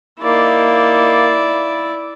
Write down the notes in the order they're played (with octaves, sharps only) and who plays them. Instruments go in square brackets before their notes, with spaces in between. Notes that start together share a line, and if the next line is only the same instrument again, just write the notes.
[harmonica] A#3 D#4 [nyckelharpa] E4 D5